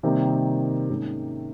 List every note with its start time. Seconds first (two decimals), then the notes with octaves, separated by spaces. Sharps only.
0.03 C3 D#3 G3 A#3 C4
0.89 G#2 D#3 A#3 C#4